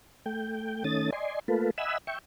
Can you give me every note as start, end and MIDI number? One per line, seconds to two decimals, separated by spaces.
0.26 0.84 57
0.26 0.84 79
0.84 1.10 51
0.84 1.10 57
0.84 1.10 61
0.84 1.10 87
0.84 1.10 93
1.12 1.40 74
1.12 1.40 75
1.12 1.40 80
1.12 1.40 84
1.48 1.71 57
1.48 1.71 58
1.48 1.71 65
1.48 1.71 69
1.48 1.71 71
1.78 1.98 75
1.78 1.98 76
1.78 1.98 78
1.78 1.98 80
1.78 1.98 83
1.78 1.98 88
2.07 2.19 76
2.07 2.19 79
2.07 2.19 85